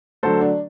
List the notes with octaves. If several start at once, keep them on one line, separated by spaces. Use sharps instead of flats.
D3 F#3 A3 A4 C5
D4